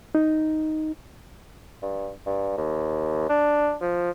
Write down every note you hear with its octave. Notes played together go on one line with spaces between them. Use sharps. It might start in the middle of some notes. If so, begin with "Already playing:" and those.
D#4
G2
G2
D#2
D4
F3